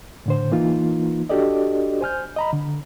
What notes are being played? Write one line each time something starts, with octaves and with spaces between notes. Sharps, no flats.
A2 D3 C5
E3 A#3 D#4 F4
D4 F#4 G4 A4 D5 D#5
C5 G#5 F6 G6
D#5 A#5 B5
D3